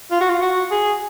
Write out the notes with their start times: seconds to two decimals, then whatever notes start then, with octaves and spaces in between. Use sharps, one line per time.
0.11 F4
0.21 F#4
0.29 F4
0.42 F#4
0.71 G#4